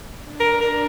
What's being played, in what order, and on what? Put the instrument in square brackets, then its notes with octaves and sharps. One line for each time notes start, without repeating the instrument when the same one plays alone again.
[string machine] D4
[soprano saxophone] A#4
A#4